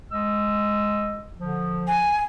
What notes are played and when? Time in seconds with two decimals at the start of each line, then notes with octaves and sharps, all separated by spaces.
0.12 G#3 D#5 E6
1.39 D3 F3
1.88 G#5